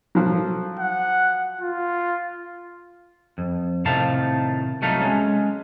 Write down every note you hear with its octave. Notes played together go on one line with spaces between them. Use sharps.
F3 F#3
F#5
F4
F2
A2 C3 D#3 A3 F5 A5
C2 F#3 A3 D#4 A4 F5
G#3 C#4